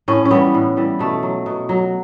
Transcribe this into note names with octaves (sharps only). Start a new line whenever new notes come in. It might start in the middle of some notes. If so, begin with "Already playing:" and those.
A2 C#4
C#4
E3 G3 B3
A2
E3 G3
B2 A3
F#3
B2
F#3